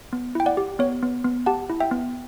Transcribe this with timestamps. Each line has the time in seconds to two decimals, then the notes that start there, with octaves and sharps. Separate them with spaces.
0.13 B3
0.35 E4 G5
0.46 D5 F#5
0.57 G4
0.79 B3 C#5
1.03 B3
1.25 B3
1.46 G4 F#5 A5
1.70 E4
1.80 E5 G5
1.91 B3